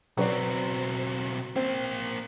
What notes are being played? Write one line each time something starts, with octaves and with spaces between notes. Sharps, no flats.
B1 F#3 C4 B4 D5
A#3 C4 C5